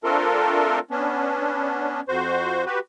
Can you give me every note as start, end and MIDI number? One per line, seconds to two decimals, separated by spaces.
0.04 0.79 57
0.04 0.79 60
0.04 0.79 62
0.04 0.79 65
0.04 0.79 69
0.04 0.79 70
0.91 2.01 59
0.91 2.01 61
0.91 2.01 62
2.08 2.64 41
2.08 2.64 66
2.08 2.64 72
2.66 2.79 66
2.66 2.79 67
2.66 2.79 71